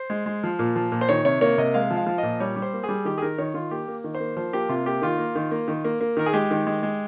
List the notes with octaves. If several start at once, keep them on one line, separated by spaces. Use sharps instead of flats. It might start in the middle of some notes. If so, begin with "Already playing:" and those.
Already playing: C5
G#3
G#3
F3
A#2
F3
A#2
C5
D#3 C#5
C3 C#5
A#3 C#5
C3 D#5
G#3 F5
F3
F5
F3
D#5
A#2
G3 C#5
G3
C5
A#3
G#4
G3
D#3 G4
G#4
D#3 A#4
D#3 C#5
D#3 F4
A#3 G4
A#3
D#3
C5
A#3
F3 C5
A#3 G4
C3 F4
A#3 G4
D#3 F4
A#3
D#3
A#3
D#3
A#3
A#3
D#3 A#4
G#4
G#3 G4
D#3
G#3
G#3